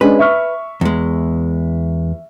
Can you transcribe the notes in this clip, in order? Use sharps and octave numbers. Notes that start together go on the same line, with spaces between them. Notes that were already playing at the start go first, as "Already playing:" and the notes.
G#3 C#4 D4 B4
E5 C#6 F6
E2 G#3